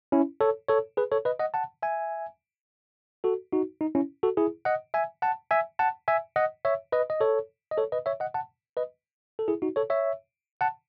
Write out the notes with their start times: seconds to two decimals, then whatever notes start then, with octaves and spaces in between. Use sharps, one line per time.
0.12 C#4 E4
0.41 A4 C#5
0.69 A4 C#5
0.97 G#4 B4
1.12 A4 C#5
1.25 B4 D#5
1.40 D#5 F#5
1.54 F#5 A5
1.82 E5 G#5
3.24 F#4 A4
3.53 D#4 F#4
3.81 D#4
3.95 C#4 E4
4.23 F#4 A4
4.37 E4 G#4
4.65 D#5 F#5
4.94 E5 G#5
5.22 F#5 A5
5.51 E5 G#5
5.79 F#5 A5
6.08 E5 G#5
6.36 D#5 F#5
6.65 C#5 E5
6.92 B4 D#5
7.10 D#5
7.21 A4 C#5
7.71 D#5
7.78 A4 C#5
7.92 B4 D#5
8.06 C#5 E5
8.20 D#5 F#5
8.34 F#5 A5
8.77 B4 D#5
9.39 A4
9.48 E4 G#4
9.62 D#4 F#4
9.76 A4 C#5
9.90 C#5 E5
10.61 F#5 A5